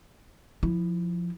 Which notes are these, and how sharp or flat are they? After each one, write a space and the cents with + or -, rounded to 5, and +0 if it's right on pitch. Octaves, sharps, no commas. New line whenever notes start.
F3 +0 E4 +0